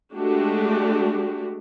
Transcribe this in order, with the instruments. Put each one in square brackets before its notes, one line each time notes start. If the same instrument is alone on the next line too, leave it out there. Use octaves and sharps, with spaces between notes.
[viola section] G#3 A3 D4 F#4 G4